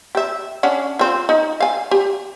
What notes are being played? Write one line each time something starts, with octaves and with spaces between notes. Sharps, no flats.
G4 E5
C#4 D4 F#5
C4 F4
D#4
F5 G#5
G4